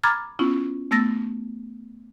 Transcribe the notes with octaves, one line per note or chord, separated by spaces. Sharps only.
A#5 B5 D6 F6 G#6 A6
B3 C#4 E4 F4
A3 B3 E6 A6 A#6